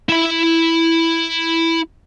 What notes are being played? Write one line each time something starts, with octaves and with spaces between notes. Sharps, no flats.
E4 B5